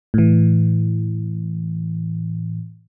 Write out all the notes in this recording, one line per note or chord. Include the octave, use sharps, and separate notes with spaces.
A2 E3